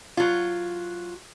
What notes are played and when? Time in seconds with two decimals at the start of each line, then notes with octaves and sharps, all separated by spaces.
0.17 F#3 F4